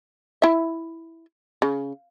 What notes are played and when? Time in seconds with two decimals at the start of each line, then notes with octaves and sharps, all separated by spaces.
0.42 E4 E5
1.62 C#3